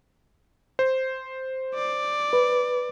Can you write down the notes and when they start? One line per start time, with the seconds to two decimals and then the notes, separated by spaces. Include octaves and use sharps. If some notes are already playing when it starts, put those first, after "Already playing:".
0.79 C5
1.75 D5
2.33 B4